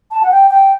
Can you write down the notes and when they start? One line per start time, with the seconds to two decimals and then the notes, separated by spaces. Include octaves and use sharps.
0.11 A5
0.23 F#5
0.31 G5
0.51 G5